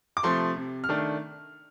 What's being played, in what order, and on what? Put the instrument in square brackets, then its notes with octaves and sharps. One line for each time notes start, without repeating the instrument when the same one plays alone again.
[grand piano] D6
C3 F3 A3 C6
C3
F6
D#3 A3 D4